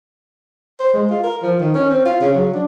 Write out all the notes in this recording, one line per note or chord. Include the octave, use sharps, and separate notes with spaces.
C5
G#3
F4
A#4
F3
D#3
C#4
C4
F4
C#3
F#3
D4